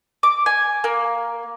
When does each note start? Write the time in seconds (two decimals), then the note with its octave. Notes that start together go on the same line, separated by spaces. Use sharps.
0.23 D6
0.46 G#5
0.84 A#3